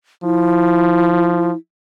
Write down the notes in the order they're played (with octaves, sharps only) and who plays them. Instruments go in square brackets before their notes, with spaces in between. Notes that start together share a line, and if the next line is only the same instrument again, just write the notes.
[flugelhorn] F3 [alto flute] E4